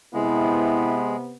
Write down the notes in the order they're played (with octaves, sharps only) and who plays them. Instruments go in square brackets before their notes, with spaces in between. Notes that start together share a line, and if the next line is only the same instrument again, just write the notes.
[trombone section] C3 B3 [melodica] G#3 [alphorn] E4